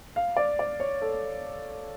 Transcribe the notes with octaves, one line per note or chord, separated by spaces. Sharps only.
F5
D5
D5
C#5
A4